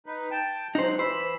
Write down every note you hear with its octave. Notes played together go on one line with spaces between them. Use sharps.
D#4 B4
G5 A5
F#3 G#3 D#4 C5 F#6
E3 C5 B5 E6